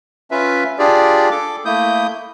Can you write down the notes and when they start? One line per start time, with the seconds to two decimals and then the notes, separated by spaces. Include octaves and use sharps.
0.31 C#4 F4 B4 E5
0.79 D4 F4 G4 G#4 D5
1.31 A4 D6
1.65 A3 A#3 E4 D#6 G6